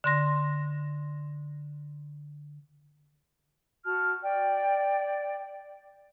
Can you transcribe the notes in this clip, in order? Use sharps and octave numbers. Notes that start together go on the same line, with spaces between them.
D3 C6 A#6
F#4 A5 F6
D5 G5